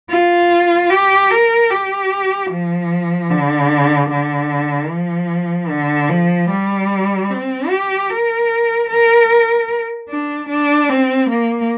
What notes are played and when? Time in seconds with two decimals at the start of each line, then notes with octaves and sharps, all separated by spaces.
0.10 F4
0.91 G4
1.31 A#4
1.70 G4
2.50 F3
3.30 D3
4.10 D3
4.90 F3
5.70 D3
6.10 F3
6.50 G3
7.30 C4
7.70 G4
8.09 A#4
8.90 A#4
10.09 D4
10.49 D4
10.89 C4
11.30 A#3